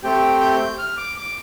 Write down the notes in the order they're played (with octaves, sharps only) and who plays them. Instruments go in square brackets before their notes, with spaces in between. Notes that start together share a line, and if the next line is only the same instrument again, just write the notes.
[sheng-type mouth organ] A3 C4 G4 G5
G6
F6
D6
D6